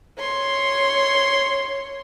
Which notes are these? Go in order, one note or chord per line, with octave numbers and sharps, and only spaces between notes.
C#5 C6